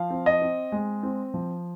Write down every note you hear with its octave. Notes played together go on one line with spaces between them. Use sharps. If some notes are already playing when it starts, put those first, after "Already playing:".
Already playing: F3 F5
C4
D#5
C4
G#3
C4
F3